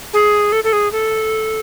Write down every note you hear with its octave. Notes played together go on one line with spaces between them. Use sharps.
G#4
A4
A4
G#4
A4